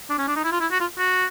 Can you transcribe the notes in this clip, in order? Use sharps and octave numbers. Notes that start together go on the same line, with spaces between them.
D4
C#4
D4
D#4
E4
F4
E4
F#4
F4
F#4